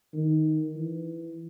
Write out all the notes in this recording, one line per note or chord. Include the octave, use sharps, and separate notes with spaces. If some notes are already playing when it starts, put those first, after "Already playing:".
D#3
E3